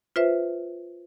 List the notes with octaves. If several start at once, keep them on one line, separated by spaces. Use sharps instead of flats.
F4 B4 C5 E5